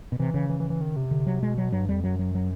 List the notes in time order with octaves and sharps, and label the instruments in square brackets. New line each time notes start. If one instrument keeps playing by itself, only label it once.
[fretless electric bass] B2
[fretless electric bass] C3 [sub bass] E3
[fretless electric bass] C#3
[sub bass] E3
E3
E3
D#3
C3
[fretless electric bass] D3
F#3
[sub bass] B2 [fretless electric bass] G#3
[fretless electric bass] F#3
[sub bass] G2 [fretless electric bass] F#3
[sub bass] F2 [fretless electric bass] G3
[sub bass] F#2 [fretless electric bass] F#3
[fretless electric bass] F#3
F#3